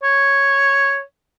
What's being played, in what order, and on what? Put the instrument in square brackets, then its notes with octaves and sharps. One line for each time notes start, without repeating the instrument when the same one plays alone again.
[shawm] C#5